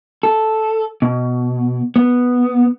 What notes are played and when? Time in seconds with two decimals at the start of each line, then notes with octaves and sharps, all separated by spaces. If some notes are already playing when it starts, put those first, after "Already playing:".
0.23 A4
1.02 B2
1.96 B3